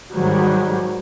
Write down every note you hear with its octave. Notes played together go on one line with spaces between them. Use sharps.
G#2 D#3 F#3 G3